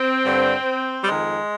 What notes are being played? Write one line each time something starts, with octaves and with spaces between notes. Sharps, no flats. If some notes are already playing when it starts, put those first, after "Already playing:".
Already playing: C4
G2 D3
G3
F2 D#3 G#3